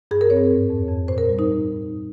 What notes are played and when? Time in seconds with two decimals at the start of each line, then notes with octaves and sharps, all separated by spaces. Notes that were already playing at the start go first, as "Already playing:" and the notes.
0.11 G2 G#4
0.21 A#4
0.30 C4 C#5
0.50 G#2
0.70 F2
0.88 F2
1.08 A#2 C5
1.18 A#4
1.29 G3
1.39 D#4